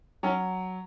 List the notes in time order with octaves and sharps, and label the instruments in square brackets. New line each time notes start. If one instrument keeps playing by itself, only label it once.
[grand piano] F#3 C#4